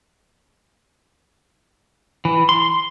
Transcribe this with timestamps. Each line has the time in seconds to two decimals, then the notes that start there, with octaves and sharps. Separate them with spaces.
2.25 E3
2.49 C6
2.62 C6